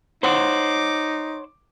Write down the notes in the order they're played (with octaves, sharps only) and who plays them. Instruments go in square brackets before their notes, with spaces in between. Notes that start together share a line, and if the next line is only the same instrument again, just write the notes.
[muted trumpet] D#4 [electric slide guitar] C5 C#5 F#5 [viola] D6